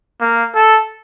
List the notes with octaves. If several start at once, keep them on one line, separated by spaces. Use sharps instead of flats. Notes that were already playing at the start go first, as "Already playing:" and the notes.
A#3
A4